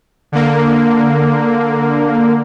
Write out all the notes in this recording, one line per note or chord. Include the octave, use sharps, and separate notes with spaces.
D3 A#3